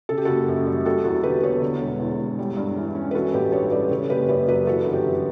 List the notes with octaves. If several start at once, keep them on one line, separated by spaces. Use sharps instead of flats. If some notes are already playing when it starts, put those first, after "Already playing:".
C#3 A4
G4
F#1 F#4 A4
F#2
G3
G3 F#4 A4
E2 F#4 A4
D3 G4 B4
B3 A4 C#5
D3
E1
E2
E1
G3
G2
E3
C#4
B4
E3 F#4 A4
A1 G4 B4
G2 A4 C#5
G3 B4 D5
C#3 A4 C#5
F#1 G4 B4
F#2 B4 D5
F#3 G4 B4
E3 F#4 A4
G1
G4 B4
F#2